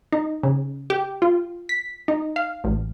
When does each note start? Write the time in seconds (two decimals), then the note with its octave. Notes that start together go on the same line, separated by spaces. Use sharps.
0.13 D#4
0.43 C#3
0.90 G4
1.22 F4
1.69 B6
2.08 D#4
2.36 F5
2.64 A1